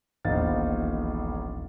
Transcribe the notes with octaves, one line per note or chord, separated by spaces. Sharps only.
D#1 A#1 E2 D#4 F5 A6